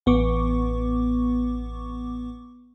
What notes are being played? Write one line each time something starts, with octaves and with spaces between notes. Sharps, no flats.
A1 B3 C#6 D6